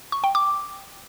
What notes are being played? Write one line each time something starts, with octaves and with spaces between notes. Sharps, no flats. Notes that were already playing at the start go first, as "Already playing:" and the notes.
C#6
G5
D6